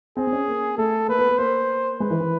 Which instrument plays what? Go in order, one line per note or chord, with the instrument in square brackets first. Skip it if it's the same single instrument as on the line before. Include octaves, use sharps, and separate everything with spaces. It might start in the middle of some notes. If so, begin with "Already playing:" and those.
[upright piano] C4 [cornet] G#4
[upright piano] C4
C#4
A#3
[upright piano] A3 [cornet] A4
[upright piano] A#3 [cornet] B4
[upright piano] B3
B3
[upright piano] A#3 [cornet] C5
[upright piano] G#3 [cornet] B4
[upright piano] E3
E3